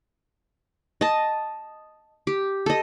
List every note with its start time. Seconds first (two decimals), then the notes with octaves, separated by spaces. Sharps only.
1.01 D#5 A5
2.27 G4
2.66 A4 D#5